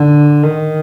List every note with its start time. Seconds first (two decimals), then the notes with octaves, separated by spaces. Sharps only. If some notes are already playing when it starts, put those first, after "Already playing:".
Already playing: D3
0.42 D#3